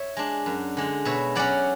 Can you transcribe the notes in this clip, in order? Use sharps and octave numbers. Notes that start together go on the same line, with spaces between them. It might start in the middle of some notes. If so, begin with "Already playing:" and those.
Already playing: C#5 E5
G#3 D4
F#2
D3 G#3
B2 C#5 E5
F#3 C#4 D5 F#5